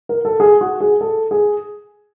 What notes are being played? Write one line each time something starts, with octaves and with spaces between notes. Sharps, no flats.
A#4
A4
G#4
F#4
G#4
A4
G#4